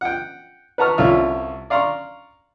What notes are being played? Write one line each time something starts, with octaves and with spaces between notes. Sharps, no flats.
F#5 G5
B4 F#5 A5 A#5 C#6 F6
C2 D3 C#4 F4 E5 F6
D5 F5 A#5 C6 C#6